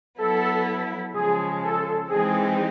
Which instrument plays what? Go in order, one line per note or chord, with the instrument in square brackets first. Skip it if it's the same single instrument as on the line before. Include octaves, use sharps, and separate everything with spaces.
[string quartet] F#3 B3 E4 [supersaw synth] A4
[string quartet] C#3 F3 G#3 [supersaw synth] G#4
[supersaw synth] A4
[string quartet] E3 G#3 C4 D#4 [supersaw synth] G#4